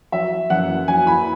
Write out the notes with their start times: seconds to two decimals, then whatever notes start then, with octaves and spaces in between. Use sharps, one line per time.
0.12 F#3 E5
0.50 F#2 F#5
0.88 F#3 G#5
1.07 B5